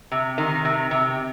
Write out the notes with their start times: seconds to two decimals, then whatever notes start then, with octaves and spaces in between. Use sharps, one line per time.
0.12 C3
0.38 D#3
0.65 C3
0.91 C3